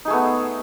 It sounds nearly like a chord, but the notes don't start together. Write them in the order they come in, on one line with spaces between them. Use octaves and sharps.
D#4 G#4 A3 B3